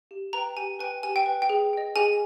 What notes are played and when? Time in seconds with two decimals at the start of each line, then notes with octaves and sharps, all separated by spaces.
0.11 G4
0.33 B4 G5 A#5
0.57 G4 G#5
0.79 B4 G5 G#5
1.03 G4 G#5
1.16 G5
1.26 B4 G5
1.42 G5
1.50 G#4
1.73 D#5 G5
1.96 G#4 G#5